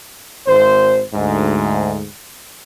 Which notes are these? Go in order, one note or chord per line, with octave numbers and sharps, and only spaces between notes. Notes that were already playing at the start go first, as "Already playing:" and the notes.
G#1 C5
D2 G#2